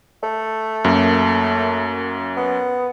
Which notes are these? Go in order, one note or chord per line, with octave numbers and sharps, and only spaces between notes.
A3
F#2 A#3
B3